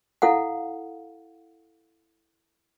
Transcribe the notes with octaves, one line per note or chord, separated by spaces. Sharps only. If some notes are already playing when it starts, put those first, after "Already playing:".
E4 A4 F5 F#5